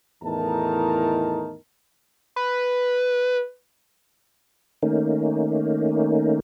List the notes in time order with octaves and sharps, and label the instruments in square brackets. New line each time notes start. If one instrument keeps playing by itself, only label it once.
[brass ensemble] E2 A2 D#3 D#4 A#4 A5
[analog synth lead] B4
[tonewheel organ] D#3 A3 A#3 C#4 D#4